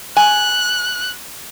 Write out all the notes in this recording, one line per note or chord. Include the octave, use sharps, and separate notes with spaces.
G#5 F#6